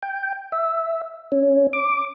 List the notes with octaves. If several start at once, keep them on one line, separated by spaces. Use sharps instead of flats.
G5
E5
C#4
D6